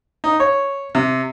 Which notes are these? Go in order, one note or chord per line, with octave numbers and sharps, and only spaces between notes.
D#4
C#5
C3